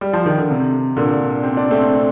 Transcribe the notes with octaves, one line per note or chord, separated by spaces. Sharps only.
G3
F3
D#3
D3
C3
A#2 D3
C4
D4
A3 C4